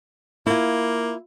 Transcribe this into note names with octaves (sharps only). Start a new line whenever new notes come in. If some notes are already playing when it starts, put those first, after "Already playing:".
A#3 E4 F4